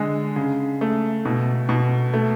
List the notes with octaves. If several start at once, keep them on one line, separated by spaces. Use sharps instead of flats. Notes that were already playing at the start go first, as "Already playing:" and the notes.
Already playing: D3 G#3
C#3
A3
B2
B2
A3